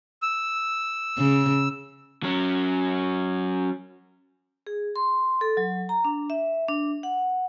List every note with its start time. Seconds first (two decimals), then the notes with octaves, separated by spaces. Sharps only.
0.22 E6
1.18 C#3
2.23 F#3 C#4
4.67 G#4
4.96 C6
5.41 A4
5.57 F#3
5.89 A#5
6.05 D4
6.30 E5
6.68 D4
7.03 F#5